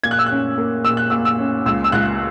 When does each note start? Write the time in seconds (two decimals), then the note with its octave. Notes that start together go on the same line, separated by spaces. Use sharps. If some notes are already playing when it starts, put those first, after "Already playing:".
0.03 A#2 G#6
0.11 F#6
0.19 E6
0.26 C#4 F#6
0.58 A#3
0.84 A#2 E6
0.97 F#6
1.10 A#2 E6
1.25 E6
1.39 C#4
1.66 C#2 E6
1.84 E6
1.92 C#2 F#6